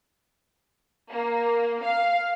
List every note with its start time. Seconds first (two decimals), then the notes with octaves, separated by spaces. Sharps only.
1.09 A#3
1.82 F5